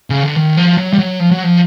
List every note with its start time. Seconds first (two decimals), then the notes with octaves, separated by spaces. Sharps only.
0.10 C#3
0.23 D3
0.36 D#3
0.57 F3
0.78 F#3
0.93 G3
0.98 F#3
1.20 F3
1.31 F#3
1.44 F3